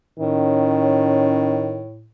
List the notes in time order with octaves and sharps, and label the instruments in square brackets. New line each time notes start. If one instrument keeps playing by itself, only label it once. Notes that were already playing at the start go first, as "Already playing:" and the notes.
[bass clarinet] A2 [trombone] D#3 [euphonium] C#4